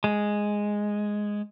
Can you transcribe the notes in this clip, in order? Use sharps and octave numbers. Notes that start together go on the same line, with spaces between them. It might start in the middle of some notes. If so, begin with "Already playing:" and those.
G#3